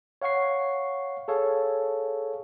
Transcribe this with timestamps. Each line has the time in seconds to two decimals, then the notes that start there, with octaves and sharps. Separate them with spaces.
0.22 C#5 F5 F#5 C#6 C7
1.28 G#4 A4 C#5 F5